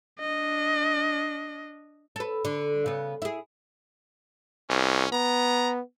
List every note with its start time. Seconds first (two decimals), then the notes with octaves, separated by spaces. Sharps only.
0.20 D4 D#5
2.16 A4 B4
2.45 D3
2.86 C#3 B3
3.22 E4 G#4
4.69 C2 C#4
5.12 B3 A#5